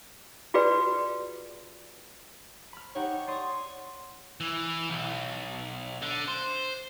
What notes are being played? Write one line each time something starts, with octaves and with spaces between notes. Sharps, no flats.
F4 F#4 G#4 B4 D5
B5 F6
D#4 G4 C#5 F#5
D5 C6 D#6
E3
B1
D3
C5